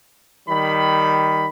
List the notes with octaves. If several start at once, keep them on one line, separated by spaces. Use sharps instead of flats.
D#3 G3 B5